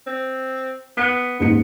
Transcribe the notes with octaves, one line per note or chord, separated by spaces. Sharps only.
C4
B3 B6
D#1 G#2 B3 C#7